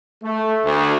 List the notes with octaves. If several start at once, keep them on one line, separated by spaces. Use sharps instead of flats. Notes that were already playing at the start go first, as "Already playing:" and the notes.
A3
D2